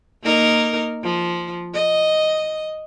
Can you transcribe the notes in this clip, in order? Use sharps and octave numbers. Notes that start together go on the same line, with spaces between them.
A#3 D#4 A#4
F3
D#5